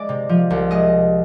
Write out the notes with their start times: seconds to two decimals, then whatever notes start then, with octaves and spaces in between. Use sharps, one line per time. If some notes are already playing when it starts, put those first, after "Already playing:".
Already playing: G#3 D5
0.09 C3
0.29 F3
0.50 C2
0.71 G#3 D#5